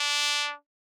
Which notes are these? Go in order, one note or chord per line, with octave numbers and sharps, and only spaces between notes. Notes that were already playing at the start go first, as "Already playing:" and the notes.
Already playing: D4